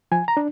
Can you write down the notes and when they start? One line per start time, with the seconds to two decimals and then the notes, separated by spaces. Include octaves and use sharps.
0.12 F3 G#5
0.28 A#5
0.37 D4